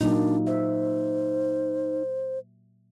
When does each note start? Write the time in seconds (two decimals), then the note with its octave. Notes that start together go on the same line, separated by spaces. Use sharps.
0.01 A#2 F#3 A#3 D4 D#4
0.47 C5 E5